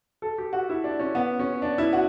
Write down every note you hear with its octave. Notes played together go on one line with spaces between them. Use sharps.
A4
G4
F#4
E4
D4
C#4
B3
C#4
D4
E4
F#4